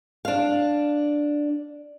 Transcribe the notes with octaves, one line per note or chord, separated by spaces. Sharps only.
D4 F5